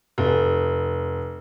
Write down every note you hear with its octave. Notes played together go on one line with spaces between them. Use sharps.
F1